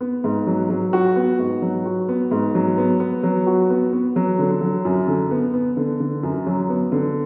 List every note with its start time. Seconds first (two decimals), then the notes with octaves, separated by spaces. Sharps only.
0.01 B3
0.24 G#2
0.47 F#3
0.70 F#3
0.93 F#4
1.16 B3
1.39 G#2
1.62 F#3
1.86 F#4
2.08 B3
2.31 G#2
2.55 F#3
2.78 B3
3.00 B3
3.23 F#3
3.47 F#4
3.70 B3
3.93 B3
4.16 F#3
4.39 D3
4.61 F#3
4.85 F#2
5.08 D3
5.31 B3
5.54 B3
5.77 D3
6.00 D3
6.23 F#2
6.46 F#3
6.70 B3
6.92 D3